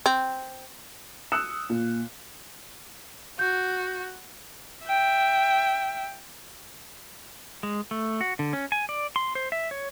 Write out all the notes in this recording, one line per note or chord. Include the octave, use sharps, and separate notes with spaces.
C4
D#6 E6 F#6 C#7 E7
A#2
F#4 G6
E5 G5
G#3
A3
F#4
D3
C#4
G#5
D5
C6
C5
E5
C#5